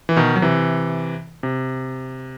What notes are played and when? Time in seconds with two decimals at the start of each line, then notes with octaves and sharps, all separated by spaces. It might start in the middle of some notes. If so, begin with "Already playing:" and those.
0.09 E3
0.17 B2 D#3
0.36 F#3
0.42 C3 E3
1.43 C3